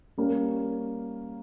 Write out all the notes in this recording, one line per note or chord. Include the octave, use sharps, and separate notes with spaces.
G3 A#3 C#4